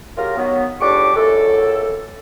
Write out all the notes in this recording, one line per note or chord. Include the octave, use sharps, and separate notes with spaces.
C#3 F#3 F4 G4 A#4
D#3 F#3 B3
C#2 A2 D4 G4 C#6 D6
C#2 F#2 A4